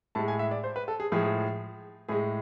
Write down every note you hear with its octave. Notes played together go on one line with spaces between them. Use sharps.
A2 G#3 A5
G#5
E5
D5
C5
B4
A4
G#4
A2 F3 G#3 G#4
A2 G#3 G#4